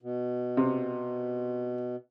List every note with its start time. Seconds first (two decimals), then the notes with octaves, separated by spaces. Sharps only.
0.02 B2
0.57 C3